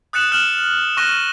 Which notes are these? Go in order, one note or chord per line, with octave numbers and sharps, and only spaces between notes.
D#6 F#6 A6 C#7 E7 F#7
F6 F#6 E7 F#7
C#6 F#6 A#6 D#7 G7